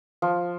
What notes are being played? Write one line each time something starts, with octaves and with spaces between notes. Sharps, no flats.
F3